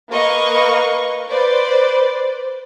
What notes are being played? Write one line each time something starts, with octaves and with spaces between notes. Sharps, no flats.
A#3 B4 D#5 F5 C#6
B4 C5 D5